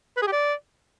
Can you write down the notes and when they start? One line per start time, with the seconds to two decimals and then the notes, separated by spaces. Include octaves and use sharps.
0.17 B4
0.22 G#4
0.27 G4
0.32 D5